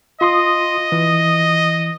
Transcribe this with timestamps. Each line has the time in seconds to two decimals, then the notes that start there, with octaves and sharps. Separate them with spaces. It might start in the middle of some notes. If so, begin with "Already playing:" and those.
0.21 F4 D#5 C6 D#6
0.92 E3